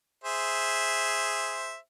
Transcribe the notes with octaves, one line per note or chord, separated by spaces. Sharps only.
G#4 C5 E5